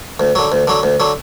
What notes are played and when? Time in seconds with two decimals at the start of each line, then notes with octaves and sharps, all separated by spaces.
0.20 D2
0.35 D3 F#3
0.52 D2
0.67 D3 F#3
0.83 D2
1.00 D3 F#3